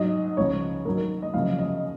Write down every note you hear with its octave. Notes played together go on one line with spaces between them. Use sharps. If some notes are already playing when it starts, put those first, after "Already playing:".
Already playing: G#2 F#3 D#5
C#2 C#3 F3 C#5
G#2 D#3 F#3 A#4
A#4
D#5
F#2 C#3 F3 F5
D#5